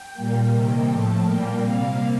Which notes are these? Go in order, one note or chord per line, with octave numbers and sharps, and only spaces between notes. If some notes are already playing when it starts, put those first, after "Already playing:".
Already playing: G5
A#2 G3 A#3
C3 D#3 G3 A#3
A2 F3 A3 A5
A#2 G3 A#3 G5
C3 G3 A#3 F5